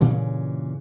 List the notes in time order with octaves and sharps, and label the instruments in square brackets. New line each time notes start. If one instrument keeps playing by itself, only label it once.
[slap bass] G2 A#2 C#3 E3